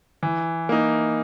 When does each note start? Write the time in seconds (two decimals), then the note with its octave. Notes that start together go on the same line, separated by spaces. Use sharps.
0.23 E3
0.69 A#3 D#4